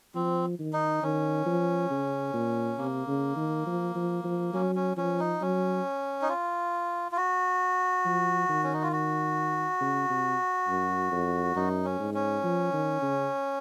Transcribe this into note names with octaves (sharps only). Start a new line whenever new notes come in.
F3 C4
D#3
D#4
D#3 C#4
F3
C#3
A#2
C3 A#3
C#3
D#3
F3
F3
F3
F#3 C#4
C#4
F3 C#4
D#4
F#3 C#4
D#4
F4
F4
F#4
F3
D#3
C#4
D#4
F4
F#4
C#3
C3
F#2
F2
F#2 D#4
C#4
G#2
C#4
F3
D#3
C#3